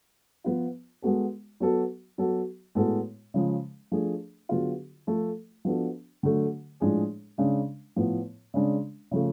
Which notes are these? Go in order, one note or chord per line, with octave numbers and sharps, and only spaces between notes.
F3 B3 F4
G#3 B3 F#4 A4
F#3 B3 F#4 A4
F#3 B3 F#4 A4
A2 G#3 B3 F#4 A4
C#3 F3 G#3
F3 A3 D4 G#4
D3 F#3 B3 F4 G#4
F3 A3 F4 A4
F3 B3 D4 F#4 A4
D3 F#3 A3
A2 F3 G#3 D4 G#4
C#3 G#3 D4
A2 F3 B3
C#3 G#3 D4
C#3 F3 A3